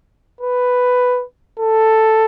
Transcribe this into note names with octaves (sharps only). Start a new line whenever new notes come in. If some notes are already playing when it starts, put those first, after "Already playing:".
B4
A4